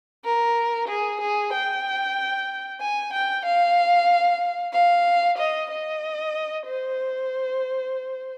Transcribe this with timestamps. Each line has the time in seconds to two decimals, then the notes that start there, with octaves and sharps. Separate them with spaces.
0.25 A#4
0.88 G#4
1.21 G#4
1.53 G5
2.81 G#5
3.13 G5
3.45 F5
4.73 F5
5.38 D#5
5.71 D#5
6.66 C5